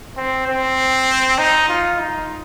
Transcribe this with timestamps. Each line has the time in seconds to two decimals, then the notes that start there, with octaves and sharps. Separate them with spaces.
0.17 C4
0.47 C4
1.39 D#4
1.69 F4
1.99 D#4